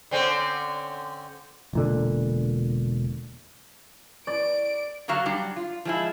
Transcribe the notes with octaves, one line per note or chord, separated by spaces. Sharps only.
D3 C4 C#4
E1 A#2 D3
D5 D7
D3 F#3 F#4 F5 A#5
F#3 G3 D4
F4
F3 G#3 E4